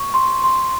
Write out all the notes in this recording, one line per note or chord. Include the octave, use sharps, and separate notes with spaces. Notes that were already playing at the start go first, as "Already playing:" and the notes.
Already playing: C#6
C6
C6